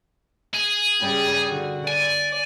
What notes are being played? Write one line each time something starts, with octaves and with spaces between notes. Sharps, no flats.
G#4
G2 C#3 G3
D3 F#4
D5 G#5